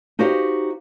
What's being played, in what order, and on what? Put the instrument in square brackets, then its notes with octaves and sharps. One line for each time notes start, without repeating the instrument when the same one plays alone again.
[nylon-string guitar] D#4 F#4 G4 C5 F5